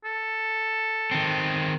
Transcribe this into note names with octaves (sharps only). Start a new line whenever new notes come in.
A4
D#3 C4